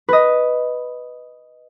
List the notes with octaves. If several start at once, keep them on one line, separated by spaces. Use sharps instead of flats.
B4 D#5